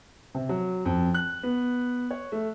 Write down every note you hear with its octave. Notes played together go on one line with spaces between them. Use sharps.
C3
F#3
F2
F#6
B3
C#5
A3